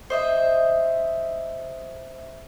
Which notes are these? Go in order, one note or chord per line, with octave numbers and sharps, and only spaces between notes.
C5 D#5 E5